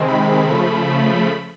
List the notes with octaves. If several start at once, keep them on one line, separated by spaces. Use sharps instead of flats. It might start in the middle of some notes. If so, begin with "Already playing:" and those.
Already playing: C3 D#3 G#3 C4
B5
C#3 F3 A3 B5